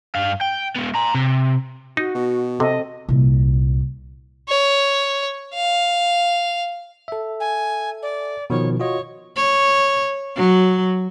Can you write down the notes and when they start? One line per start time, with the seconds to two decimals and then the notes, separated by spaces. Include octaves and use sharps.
0.15 G2 F5
0.41 G5
0.76 G#3 B3
0.95 A#5 C6
1.15 C3
1.97 D#4 F#4
2.15 B2
2.60 C3 C4 A4 D#5
3.09 C2 A#2
4.48 C#5
5.54 F5
7.08 A4 E5
7.40 G#5
8.02 D5
8.50 B2 D#3 F3 C#5
8.80 F4 F#4 C#5 D#5
9.36 C#5
10.36 F#3